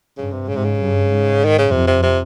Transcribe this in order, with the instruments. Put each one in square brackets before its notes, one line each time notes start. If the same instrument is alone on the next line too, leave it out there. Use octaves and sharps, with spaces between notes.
[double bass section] G2 [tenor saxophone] C#3
[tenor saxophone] C3
[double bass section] G#2 [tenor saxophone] C#3
[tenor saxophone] C3
C#3
[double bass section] G2
G#2
[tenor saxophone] D#3
C#3
[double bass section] F2 [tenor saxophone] C3
[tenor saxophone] C3
C3